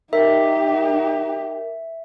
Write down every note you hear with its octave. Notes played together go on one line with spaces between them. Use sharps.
D#4 G4 A#4 E5